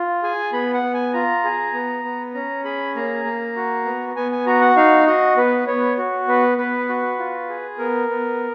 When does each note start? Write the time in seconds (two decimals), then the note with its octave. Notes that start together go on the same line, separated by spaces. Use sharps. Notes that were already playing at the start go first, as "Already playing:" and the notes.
Already playing: F4
0.23 G#4 G#5
0.53 B3 B5
0.74 F#5
0.83 B3
0.94 G#5
1.13 F4 A#5
1.44 G#4
1.74 B3
2.04 B3
2.34 C#4 A#5
2.64 G#4 B5
2.96 A#3 A#5
3.25 A#3
3.56 F#4
3.85 B3
4.16 B3 G#5
4.32 G#5
4.46 F#4 A#5
4.61 F#5
4.76 D#4 F5
5.07 F#4 D#5
5.37 B3 B4
5.67 B3 C#5
5.98 F#4
6.28 B3 B4
6.58 B3 B4
6.89 F#4
7.19 F4
7.49 G#4
7.79 B3 A#4
8.09 B3